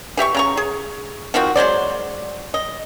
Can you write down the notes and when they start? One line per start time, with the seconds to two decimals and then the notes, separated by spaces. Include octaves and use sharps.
0.17 E3 G4 E5 C#6
0.34 C#3 A#5 C#6
0.57 G#4
1.34 D#3 F3 C4 F#4
1.56 F#3 G#3 C5 D5
2.54 D#5